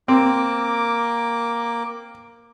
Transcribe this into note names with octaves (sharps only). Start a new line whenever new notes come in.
A#3 C4 D6